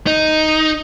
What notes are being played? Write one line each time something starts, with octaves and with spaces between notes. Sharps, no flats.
D#4